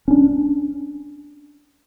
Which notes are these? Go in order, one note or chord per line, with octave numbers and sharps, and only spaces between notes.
C#4 D4